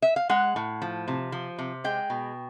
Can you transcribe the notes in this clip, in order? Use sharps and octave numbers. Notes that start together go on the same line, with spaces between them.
E5
F5
G#3 F#5
A2
F3
C3
F3
C3
G#3 G5
B2